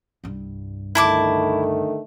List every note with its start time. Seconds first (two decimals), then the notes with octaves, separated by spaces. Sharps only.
0.24 C2 G2
0.95 D3 D#3 A3 E4 A5 D6